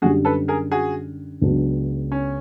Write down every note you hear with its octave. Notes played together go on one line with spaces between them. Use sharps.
F#2 D3 G3 F#4 G#4
A4 B4
G#4 A#4
F#4 G#4
C#2 C#3 F#3 B3 D4
C#4